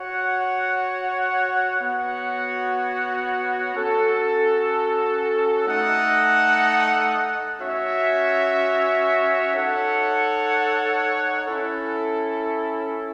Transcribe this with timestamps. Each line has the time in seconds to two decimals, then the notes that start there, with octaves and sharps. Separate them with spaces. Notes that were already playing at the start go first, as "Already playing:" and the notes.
Already playing: F#4 C#5 F#5
1.80 B3 F#4 C#5 F#5
3.73 C#4 F#4 A4
5.67 A3 D#4 A4 D#5 F#5
7.60 C#4 F#4 C#5 E5
9.53 D#4 A4 C#5 F#5
11.45 C#4 E4 A4